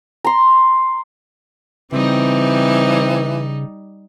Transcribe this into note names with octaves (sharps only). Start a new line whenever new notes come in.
A#5 C6
C#3 E3 G3 C4 D#4